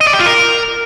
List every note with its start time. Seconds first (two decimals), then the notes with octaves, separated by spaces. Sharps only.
0.01 D#5
0.07 D5
0.13 G4
0.20 F4
0.26 A#4